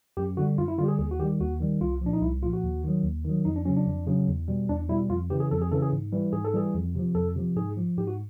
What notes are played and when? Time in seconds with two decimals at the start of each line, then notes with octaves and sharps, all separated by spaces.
0.17 F#2 G4
0.37 D3 G3 F#4
0.58 F#2 F4
0.68 E4
0.78 D3 F4
0.81 G3 G4
0.88 G#4
0.99 D#2 G#4
1.11 F#4
1.19 D#3 G4
1.23 G3
1.40 D#2 F#4
1.60 D#3 G3
1.81 C2 F4
2.01 A#2 F3 D4
2.13 D#4
2.22 C2 E4
2.42 A#2 F3 F4
2.53 F#4
2.63 D#2
2.84 D#3 F#3
3.04 D#2
3.24 D#3
3.29 F#3
3.45 F2 D#4
3.56 D4
3.65 C#3 F#3 C#4
3.76 D4
3.87 F2
4.07 C#3 F#3
4.28 E2
4.48 B2 G3
4.69 E2 D4
4.89 B2 G3 E4
5.10 F2 F4
5.30 C#3 E3 G4
5.40 G#4
5.51 F2 A4
5.61 G#4
5.72 C#3 E3 A4
5.82 G#4
5.93 G#2
6.13 E3 G3
6.33 G#2 G#4
6.45 A4
6.54 E3 G3 G#4
6.74 F2
6.95 C3 F3
7.15 F2 A4
7.36 C3 F3
7.56 G#2 G#4
7.77 F3
7.98 G#2 G4
8.07 F#4